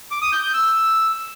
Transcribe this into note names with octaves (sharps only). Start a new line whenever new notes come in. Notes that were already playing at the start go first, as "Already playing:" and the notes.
D6
D#6
G6
G6
E6